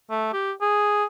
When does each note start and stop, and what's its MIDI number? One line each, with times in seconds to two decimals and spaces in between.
0.10 0.29 57
0.33 0.52 67
0.61 1.04 68